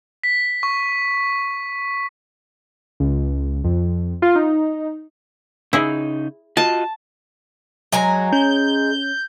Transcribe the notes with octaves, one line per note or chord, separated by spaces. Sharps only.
B6
C#6
C#2
F2
F4
D#4
C#3 D#4 E4 G#4
F4 F#4 D#5 A5
F#3 G#3 G#5 A#5
C#4 G6